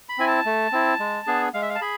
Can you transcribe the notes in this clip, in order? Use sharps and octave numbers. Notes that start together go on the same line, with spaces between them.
B5
C4 E4 G#5
A5
A3
C4 E4
G#3
B3 D4 G#4
G#3 F5
E5
F5
A5
G#4 B5